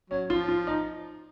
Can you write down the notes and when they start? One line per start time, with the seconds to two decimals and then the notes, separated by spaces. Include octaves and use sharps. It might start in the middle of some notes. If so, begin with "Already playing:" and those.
0.10 F#3 C#4
0.30 F3 F4
0.48 F4
0.67 D#4